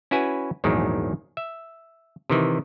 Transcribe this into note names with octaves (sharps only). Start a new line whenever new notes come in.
C#4 E4 F#4 B4 G#5
A#1 E2 G#2 D#3 F#3
E5
C3 D#3 E3